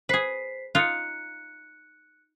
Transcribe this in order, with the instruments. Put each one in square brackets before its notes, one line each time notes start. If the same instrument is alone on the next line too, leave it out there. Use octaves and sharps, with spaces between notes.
[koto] G#4 B4 [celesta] C5 B6 C7
[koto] D#4 F4 [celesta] F#6 C#7